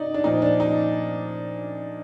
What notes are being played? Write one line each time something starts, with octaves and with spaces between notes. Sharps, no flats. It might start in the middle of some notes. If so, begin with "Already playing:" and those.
Already playing: C3 D#4 D5
D4
A#2 F3 D#4
D4
D#4